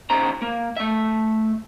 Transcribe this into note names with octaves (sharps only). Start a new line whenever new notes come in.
D#2 C#3 C5 A#5
A#3
A3 E5